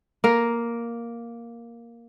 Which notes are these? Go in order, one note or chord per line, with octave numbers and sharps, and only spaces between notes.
A#3 A#4